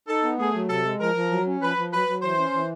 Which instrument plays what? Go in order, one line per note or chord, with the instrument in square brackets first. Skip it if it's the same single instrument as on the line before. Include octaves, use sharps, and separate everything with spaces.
[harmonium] D#4 [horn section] A4
[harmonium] B3
[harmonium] A3 [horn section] G#4
[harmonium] F#3
[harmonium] C3 [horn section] A4
[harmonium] G#3
[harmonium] F3 [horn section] A#4
[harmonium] F3
F#3
C#4
[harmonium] F3 [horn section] B4
[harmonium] F3
[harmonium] F#3 [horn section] B4
[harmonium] F#3
[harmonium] E3 [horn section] C5
[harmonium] C#4
E3